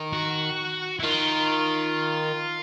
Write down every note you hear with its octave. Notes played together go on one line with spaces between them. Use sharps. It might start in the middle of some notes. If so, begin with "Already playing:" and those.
Already playing: D#3
F#4
E4
D#3 F4